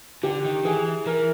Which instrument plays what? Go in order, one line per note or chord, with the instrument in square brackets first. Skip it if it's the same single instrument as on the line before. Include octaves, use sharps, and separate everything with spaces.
[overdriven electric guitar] D3 [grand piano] G4
[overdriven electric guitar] D#3
[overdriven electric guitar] E3 [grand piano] G#4
[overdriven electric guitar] E3 [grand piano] A#4